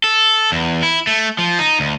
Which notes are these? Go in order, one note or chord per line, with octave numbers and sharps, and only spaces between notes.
A4
E2
E4
A3
F3
D#4
D2